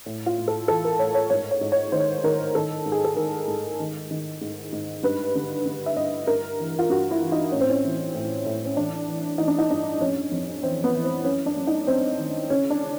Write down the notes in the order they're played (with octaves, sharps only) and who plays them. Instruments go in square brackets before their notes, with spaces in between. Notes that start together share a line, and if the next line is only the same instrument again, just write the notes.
[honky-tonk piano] A2
F4
A2
A4
E3 A4
A#4
A2 C#5
C#5
G#2 C#5
C#5
G#2
C#5
D#3 C5
D#3 A#4
D#3 A4
G#2
G#4
A4
D#3 A#4
G#2
D#3
D#3
G#2
G#2
G2 B4
D3
D3
E5
G2 D#5
G2 A#4
E3
F4
G2 F#4
E4
E3
D#4
A2 C#4
C4
C#4
E3
A2
A2
C#4
E3 D4
E3
E3 D#4
D4
D#4
G2 D4
F2 C#4
F2
E3 C4
B3
E3
C4
F#2 C#4
D4
F#2
D#4
F#2 C4
D#3
C#3 C#4
D4